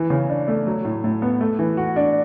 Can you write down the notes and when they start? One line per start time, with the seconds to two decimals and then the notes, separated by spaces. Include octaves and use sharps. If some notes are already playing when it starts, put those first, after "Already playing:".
Already playing: E3
0.10 C#3
0.29 D4
0.48 A3
0.67 F#3
0.85 A2
1.04 A2
1.22 B3
1.41 A3
1.59 E3
1.77 F#4
1.96 D4